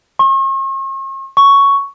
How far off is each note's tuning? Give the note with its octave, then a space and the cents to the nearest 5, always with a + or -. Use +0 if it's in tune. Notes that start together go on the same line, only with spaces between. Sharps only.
C#6 -45
C#6 +5